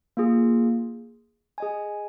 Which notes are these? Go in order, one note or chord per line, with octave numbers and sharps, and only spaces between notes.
A#3 F4 G#4
G#4 D#5 G#5